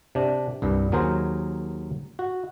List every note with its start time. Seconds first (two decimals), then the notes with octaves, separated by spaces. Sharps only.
0.15 C3 D4
0.62 C2 G2
0.92 D#2 F#3 G#4 A#4 C5
2.19 F#4